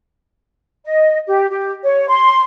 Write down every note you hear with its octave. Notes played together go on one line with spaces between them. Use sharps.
D#5
G4
G4
C#5
C6